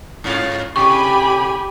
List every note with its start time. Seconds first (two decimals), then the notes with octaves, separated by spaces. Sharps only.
0.24 G#2 C#4 F4
0.76 A2 C3 G4 G#5 B5 C#6